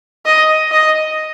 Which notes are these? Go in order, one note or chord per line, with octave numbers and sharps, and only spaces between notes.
D#5
D#5